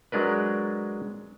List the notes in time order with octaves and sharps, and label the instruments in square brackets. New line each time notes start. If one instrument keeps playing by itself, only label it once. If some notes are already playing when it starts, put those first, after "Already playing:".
[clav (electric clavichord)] F#3 G#3 D4 A#4 B4